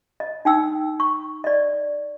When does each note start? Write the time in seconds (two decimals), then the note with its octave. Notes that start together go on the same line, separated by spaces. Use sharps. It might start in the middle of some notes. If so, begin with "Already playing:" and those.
0.20 D#5
0.45 D#4 G5 E6
1.00 C#6
1.44 D5 D#5